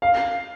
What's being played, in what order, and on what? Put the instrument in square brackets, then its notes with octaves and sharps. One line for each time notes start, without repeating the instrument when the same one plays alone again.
[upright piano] F5